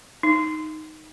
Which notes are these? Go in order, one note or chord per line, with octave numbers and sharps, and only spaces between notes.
D#4